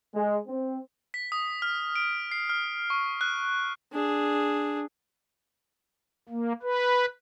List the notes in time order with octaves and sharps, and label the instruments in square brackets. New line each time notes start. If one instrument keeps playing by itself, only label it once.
[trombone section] G#3
C4
[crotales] B6
D#6
F6
D7
C7
F6
C#6
F#6
[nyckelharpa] D4 G#4
[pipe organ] A#3
B4